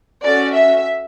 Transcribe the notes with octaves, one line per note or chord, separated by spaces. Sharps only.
C#4 F#4 A4 D5
E5